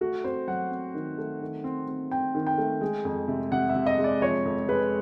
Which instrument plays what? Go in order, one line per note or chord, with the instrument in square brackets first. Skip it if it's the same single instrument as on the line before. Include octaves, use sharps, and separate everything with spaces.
[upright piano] A3 [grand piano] F#4
[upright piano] C4 [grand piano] C5
[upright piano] F#3 [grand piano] F#5
[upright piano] C4
D#3
A3
D#3
C4
C4
[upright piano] C4 [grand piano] G5
[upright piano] D#3
[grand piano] G5
[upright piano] A3
G#3
F2
C3
[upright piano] C3 [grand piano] F#5
[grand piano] E5
[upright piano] C3
[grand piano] D#5
[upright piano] G#3
[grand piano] D5
[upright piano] F3 [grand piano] C#5
[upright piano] F2
[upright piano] G#3 [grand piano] B4